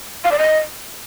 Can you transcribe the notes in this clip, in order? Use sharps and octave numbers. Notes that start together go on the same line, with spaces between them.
F5
D5
D#5